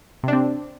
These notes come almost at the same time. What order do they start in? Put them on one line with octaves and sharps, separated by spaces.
C3 D4 C4